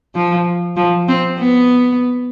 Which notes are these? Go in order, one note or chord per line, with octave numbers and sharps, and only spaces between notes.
F3
F3
C4
B3